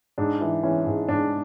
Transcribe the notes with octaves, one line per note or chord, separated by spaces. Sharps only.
G#2 D4
E3
E3 C#4
G#2
G#2 D4